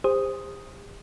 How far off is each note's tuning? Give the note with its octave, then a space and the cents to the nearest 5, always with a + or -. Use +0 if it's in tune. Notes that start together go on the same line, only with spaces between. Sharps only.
G4 +45 C5 +0 D#6 +0